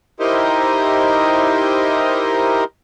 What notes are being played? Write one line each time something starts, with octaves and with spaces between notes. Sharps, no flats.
D#4 E4 G4 A#4 C5 D#5